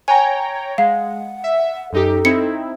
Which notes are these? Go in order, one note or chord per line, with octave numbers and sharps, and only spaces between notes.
C#5 G5 G#5 A#5
G#3 F5 F#5
E5
F#2 D#4 G4 A4
C4 D#4 E4 C#7